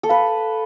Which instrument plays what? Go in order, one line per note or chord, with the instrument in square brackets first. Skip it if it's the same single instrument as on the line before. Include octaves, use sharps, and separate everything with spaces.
[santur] A4
[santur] B4 [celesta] F5